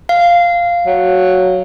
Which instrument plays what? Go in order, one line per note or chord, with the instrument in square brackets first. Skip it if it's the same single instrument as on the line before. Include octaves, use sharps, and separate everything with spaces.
[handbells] F5
[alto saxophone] F#3